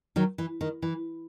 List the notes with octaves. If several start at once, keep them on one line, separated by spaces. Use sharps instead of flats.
D#3 F#3
E3
D#3
E3